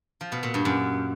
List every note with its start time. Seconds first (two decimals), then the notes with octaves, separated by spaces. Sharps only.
0.21 F3
0.32 B2
0.43 A#2
0.54 G2
0.65 F#2